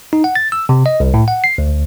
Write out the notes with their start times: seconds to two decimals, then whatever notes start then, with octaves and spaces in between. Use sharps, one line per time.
0.13 D#4
0.24 F#5
0.35 A6
0.52 E6
0.69 C3
0.86 D#5
1.00 C2
1.14 A2
1.28 F#5
1.44 C7
1.58 D2